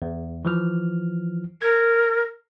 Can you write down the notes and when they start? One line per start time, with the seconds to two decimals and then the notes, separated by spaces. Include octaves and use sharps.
0.02 E2
0.45 E3 F3 F6
1.62 A#4 G#6